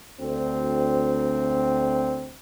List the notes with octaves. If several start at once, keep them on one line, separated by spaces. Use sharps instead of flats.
D2 C4